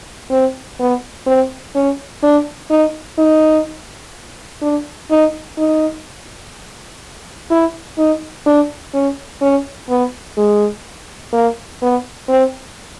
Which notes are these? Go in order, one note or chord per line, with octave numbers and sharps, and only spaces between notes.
C4
B3
C4
C#4
D4
D#4
D#4
D4
D#4
D#4
E4
D#4
D4
C#4
C#4
B3
G#3
A#3
B3
C4